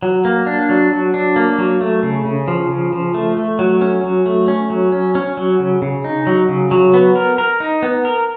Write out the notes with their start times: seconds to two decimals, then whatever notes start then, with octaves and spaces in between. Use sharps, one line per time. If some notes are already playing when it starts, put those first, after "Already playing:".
0.03 F#3
0.25 A#3
0.47 D4
0.69 F#3
0.92 F#3
1.14 D4
1.36 A#3
1.58 F#3
1.81 A3
2.03 C#3
2.25 C#3
2.48 F3
2.70 C#3
2.92 F3
3.14 A3
3.37 A3
3.59 F#3
3.81 C#4
4.04 F#3
4.26 A3
4.48 C#4
4.70 F#3
4.92 C#4
5.15 C#4
5.37 F#3
5.60 C#3
5.82 C#3
6.04 D#4
6.27 F#3
6.49 C#3
6.71 F#3
6.94 B3
7.16 A#4
7.38 A#4
7.60 D#4
7.83 B3
8.05 A#4